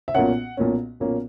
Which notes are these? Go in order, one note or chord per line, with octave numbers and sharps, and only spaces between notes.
E5
B1 A#2 A#3 C#4 F#5
B1 A#2 A#3 C#4
B1 A#2 A#3 C#4